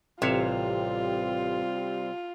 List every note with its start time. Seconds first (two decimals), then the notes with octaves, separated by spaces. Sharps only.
0.22 A1 C3 G3 C4 F4 C#5 E5